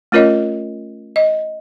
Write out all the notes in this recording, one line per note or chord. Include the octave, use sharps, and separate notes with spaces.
A3 C#4 F4 A#4 C#5 D#5
D#5